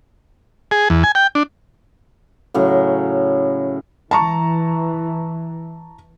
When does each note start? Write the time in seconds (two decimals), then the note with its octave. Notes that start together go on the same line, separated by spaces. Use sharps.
0.71 G#4
0.90 E2
1.04 G#5
1.15 G5
1.35 D4
2.54 A2 C#3 F#3
4.11 E3 A5 A#5 C#6